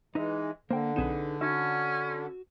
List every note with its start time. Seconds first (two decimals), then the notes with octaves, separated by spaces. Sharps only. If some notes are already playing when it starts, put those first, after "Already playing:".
0.15 E3 G#3 D#4 B4 D#5 E5
0.70 D3 A#3 C5 G5
0.96 B1 C4 D#4 G#4 B4 E7
1.41 C#4 D#4 F#4 E5